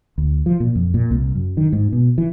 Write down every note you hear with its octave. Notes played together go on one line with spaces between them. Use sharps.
D2
F3
A#2
F2
A#2
C2
F#2
D#3
G#2
B2
E3